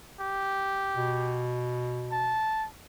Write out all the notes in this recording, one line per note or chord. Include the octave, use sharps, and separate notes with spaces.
G4
B2
A5